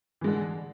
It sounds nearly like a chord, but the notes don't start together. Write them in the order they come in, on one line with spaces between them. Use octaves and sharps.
E3 G#3 D3